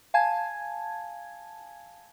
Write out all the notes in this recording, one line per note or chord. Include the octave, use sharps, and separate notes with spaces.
F5 G#5 A5 G#6